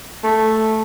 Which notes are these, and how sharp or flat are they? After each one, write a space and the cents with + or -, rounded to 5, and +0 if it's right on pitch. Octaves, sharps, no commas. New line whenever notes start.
A3 +0